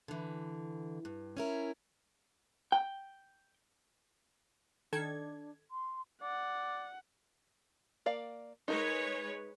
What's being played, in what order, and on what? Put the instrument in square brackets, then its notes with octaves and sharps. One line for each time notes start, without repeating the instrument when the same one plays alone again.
[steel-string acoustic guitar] D3 E3
G2
C#4 E4 A#4
[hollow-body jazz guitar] G5
[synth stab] D#3 A4 G#6 [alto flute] D4
[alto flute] C6
[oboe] D5 [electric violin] F#5
[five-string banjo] A#3 D5 F5
[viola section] G#3 B4 C#5 [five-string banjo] D#4 A#4